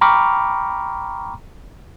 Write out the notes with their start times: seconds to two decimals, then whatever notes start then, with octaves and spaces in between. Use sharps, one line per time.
0.01 G5 A#5 B5 C#6 D6 F6